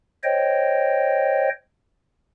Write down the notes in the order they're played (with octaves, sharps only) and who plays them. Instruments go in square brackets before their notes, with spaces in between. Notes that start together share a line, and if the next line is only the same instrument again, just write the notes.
[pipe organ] C5 C#5 D#5 G5